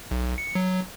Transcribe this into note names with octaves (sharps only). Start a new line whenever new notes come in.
B1
C#7
F#3